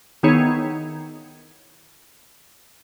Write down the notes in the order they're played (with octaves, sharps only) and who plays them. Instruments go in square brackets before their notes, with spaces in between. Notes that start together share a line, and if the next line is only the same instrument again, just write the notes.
[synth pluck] D#3 B3 D#4 E4 G#4 C#5